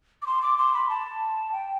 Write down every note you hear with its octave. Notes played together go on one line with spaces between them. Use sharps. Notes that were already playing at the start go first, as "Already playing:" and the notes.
D6
C6
D6
C6
B5
A5
G5